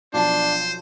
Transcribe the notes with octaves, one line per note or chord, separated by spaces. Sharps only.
B1 F3 D4 C5 A5